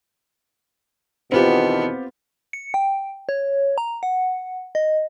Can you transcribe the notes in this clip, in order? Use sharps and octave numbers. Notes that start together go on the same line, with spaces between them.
E2 B2 D#3 B3 C4 F4 G4
C#7
G5
C#5
A#5
F#5
D#5